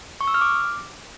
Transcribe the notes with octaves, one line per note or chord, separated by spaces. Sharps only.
C#6
E6
F6
D6